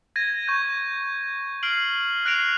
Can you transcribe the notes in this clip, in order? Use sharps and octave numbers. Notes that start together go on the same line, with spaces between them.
G#6 A#6 D#7
C#6 G6
F6 C7 D7 F#7
F#6 A#6 C7 D7 F7